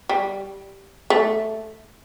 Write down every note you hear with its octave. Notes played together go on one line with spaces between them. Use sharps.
G3
A3